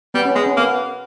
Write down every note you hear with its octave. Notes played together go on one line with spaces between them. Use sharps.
G3 B3
C#4
G#3 B3
C#4
A#3 B3